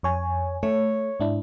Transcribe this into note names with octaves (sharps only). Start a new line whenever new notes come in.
F2 C#5 G#5
A3 C#5
G#2 D4 E4